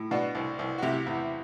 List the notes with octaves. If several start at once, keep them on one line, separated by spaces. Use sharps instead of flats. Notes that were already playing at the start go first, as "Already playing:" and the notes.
Already playing: A2
B2 D4 F#4
C2
C2
F#4
C3 E4 G4
E2